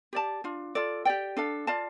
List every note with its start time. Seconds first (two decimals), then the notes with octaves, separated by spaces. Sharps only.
0.13 G4 D5 A5
0.44 D4 F4
0.75 F4 A4 D5
1.05 G4 D5 G5
1.37 D4 A4 F5
1.67 F4 D5 F5 A5